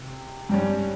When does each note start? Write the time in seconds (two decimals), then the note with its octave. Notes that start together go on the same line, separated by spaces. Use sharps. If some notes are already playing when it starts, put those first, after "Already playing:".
Already playing: C3
0.49 G2 G3 C#4